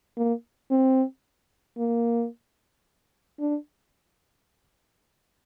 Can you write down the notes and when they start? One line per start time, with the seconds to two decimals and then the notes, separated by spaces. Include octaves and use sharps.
0.17 A#3
0.70 C4
1.78 A#3
3.39 D4